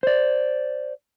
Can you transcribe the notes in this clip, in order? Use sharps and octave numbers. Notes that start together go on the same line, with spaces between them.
C5 D5